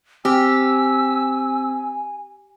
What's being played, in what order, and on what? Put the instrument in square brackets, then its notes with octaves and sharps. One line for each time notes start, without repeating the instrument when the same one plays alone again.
[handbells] C4 [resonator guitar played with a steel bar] G4 [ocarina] G#5 [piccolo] E6